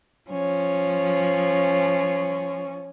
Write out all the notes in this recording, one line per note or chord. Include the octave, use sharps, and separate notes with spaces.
F3 C#4